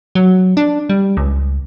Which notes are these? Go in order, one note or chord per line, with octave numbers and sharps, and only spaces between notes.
F#3
D4
G3
C#2